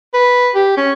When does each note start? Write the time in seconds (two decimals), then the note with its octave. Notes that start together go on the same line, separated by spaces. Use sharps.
0.14 B4
0.55 G4
0.77 C#4